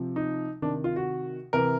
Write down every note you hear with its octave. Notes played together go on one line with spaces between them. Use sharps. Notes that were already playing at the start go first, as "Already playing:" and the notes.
Already playing: C3 F3
D#4
C3 D#3 D4
F4
F#4
C3 E3 A#4